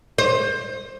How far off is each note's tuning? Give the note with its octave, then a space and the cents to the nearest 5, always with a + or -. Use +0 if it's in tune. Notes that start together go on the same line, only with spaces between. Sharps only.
C5 +25